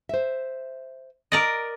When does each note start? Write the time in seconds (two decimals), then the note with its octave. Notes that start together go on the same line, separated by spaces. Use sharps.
0.09 C5 E5
1.32 A#4 D5 D#5